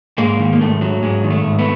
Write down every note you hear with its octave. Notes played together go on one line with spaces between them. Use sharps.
G#2 G#3 A#3
D#3
A#3
G#2 A3
F#3
G#2 G#3
D#3
A3
G#2
A3 B3